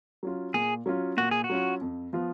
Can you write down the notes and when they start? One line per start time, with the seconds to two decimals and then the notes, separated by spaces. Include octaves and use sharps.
0.23 F#3 C#4 F4
0.54 A#2 G#4
0.86 F#3 C#4 F4
1.17 A#2 F#4
1.31 G#4
1.44 F#4
1.50 F#3 C#4 F4
1.81 F2
2.13 F3 B3 F4